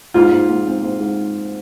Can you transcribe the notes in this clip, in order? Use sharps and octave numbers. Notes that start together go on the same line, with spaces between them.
G#2 F4
G#2
G#2
C4
G#2
G#2